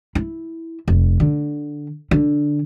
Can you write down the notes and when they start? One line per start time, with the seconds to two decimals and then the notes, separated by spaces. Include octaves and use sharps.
0.15 E4
0.88 F1
1.20 D3
2.11 D3